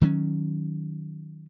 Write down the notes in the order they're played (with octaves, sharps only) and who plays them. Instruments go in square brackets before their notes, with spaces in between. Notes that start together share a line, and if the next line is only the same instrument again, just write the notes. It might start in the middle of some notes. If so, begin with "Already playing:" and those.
[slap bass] D#3 F#3 A3 C#4